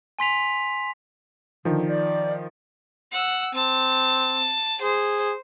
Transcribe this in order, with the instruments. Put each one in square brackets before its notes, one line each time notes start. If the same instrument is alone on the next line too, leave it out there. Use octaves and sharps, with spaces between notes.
[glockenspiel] G#5 C6 B6 F7
[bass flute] D3 [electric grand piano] D#3 F3
[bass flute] D5
[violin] F#5 E6
[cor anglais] C4 [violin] A5
[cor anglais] G#4 [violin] C5